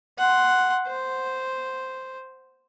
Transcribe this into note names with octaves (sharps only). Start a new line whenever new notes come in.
F#5 C6
C5